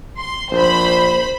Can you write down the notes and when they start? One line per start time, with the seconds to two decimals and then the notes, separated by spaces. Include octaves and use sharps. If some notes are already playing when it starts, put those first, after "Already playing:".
0.18 C6
0.52 A#1 C5 B5